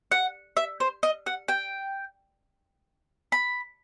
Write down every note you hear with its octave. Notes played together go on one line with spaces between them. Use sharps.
F#5
E5
C5
D#5
F#5
G5
B5